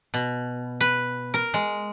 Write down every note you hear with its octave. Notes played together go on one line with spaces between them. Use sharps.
B2
B4
A#4
G#3